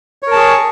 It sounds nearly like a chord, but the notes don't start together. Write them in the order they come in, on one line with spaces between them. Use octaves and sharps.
C#5 A#4 A5 G#4 C#6